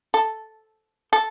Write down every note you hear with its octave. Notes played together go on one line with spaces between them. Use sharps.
A4
A4